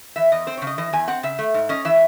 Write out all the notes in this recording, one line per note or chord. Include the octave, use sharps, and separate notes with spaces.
E3 E5
E2 D#5
C4 C5
C#5
C#3
D#5
E3 D#5
E2 G#5
C4 F#5
C#3 E5
A3
G#2
C#4 D#5
E3 E5